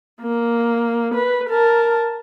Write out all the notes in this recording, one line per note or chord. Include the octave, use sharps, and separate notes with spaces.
A#3
B4
A#4 A5